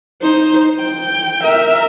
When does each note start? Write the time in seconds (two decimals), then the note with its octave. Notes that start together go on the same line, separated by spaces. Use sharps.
0.22 D#4 C5
0.80 G5
1.42 A#4 E5